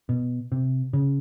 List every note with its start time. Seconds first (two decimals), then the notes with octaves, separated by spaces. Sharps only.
0.09 B2
0.52 C3
0.93 C#3